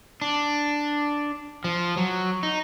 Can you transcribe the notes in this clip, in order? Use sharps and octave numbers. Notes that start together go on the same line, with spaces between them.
D4
F3
F#3
D#4